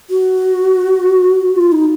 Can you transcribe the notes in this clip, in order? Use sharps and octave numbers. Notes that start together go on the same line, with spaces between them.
F#4
F4
D#4